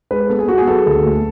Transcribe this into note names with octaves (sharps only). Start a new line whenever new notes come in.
G#3 B4
B3 A4
G#4
B3 F#4
G#4
F#3 A4
D2
A3